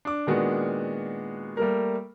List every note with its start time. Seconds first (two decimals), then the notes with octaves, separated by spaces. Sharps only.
0.05 D4 D6
0.27 A#2 D#3 G#3 B3 D4 F#4
1.57 G3 A3 A#3 A#4